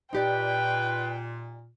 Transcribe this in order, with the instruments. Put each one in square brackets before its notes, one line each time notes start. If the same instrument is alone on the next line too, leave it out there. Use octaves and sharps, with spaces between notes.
[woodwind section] A#2 [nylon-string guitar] D#4 G4 D5 [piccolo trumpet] B4 [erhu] G5